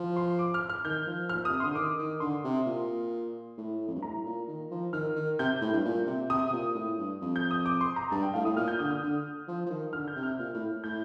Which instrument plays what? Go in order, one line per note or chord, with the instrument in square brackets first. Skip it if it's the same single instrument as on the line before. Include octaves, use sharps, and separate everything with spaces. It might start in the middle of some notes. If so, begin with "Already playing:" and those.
Already playing: [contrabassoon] F3
[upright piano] C6
D6
F6
F6
[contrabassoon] D#3 [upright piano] G6
[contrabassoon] F3
[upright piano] F6
[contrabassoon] A#2
[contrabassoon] C3 [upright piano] D#6
[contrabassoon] D3 [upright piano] C6
[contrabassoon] D#3 [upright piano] D6
[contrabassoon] D#3
[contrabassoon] D3 [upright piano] C6
[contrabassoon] C3
A#2
A2
F2
G2
[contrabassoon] A2 [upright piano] A#5
[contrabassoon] A#2
D#3
F3
[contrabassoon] D#3 [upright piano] F6
[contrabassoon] D#3
[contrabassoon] C3 [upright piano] G6
[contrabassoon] A2
G2
A#2
C3
[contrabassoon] C3 [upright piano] D#6
[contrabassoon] C3
A#2
A2
G2
F2
[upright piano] G6
D#6
D6
C6
A#5
[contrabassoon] G2 [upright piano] A5
[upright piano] G5
[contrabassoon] A2 [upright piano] F5
[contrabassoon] A2 [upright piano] D#6
[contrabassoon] A#2 [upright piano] F6
[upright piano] G6
[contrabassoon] D3 [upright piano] D#6
[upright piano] F6
[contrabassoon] D3
F3
F3
D#3
[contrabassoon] D3 [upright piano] F6
[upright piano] G6
[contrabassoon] C3
[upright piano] F6
[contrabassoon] A#2
A2
[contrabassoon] A2 [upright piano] G6